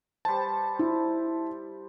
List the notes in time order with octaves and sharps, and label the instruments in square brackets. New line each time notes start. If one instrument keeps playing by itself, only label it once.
[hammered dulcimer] G3 C5 [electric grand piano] A5
[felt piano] E4